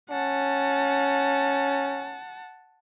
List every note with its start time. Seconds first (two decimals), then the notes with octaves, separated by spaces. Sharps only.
0.10 C#4 F#5 A5